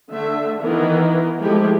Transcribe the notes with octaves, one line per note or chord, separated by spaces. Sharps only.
D3 A3 E5
D#3 E3 B3 E4 A#4
F3 G#3 A3 E4 G4